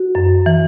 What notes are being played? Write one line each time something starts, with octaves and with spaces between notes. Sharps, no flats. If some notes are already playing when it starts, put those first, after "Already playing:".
Already playing: F#4
F#2
E3